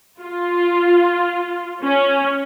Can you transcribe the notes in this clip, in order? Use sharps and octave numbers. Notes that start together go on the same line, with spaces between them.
F4
C#4